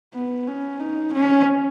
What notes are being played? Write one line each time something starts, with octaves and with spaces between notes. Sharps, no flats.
B3
C#4
D#4
C#4